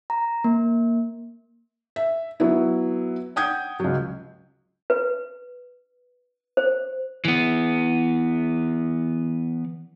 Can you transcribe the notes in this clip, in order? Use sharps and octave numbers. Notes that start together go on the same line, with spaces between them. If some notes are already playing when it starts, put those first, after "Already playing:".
A#5
A#3
E5
F#3 B3 E4
F#5 G5 D#6 G6 G#6
C#2 F#3
B4
C5
E3 B3